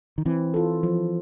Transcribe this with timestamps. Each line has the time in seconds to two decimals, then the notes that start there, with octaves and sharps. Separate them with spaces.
0.18 D#3
0.25 E3 C4
0.54 F4 A4
0.83 F3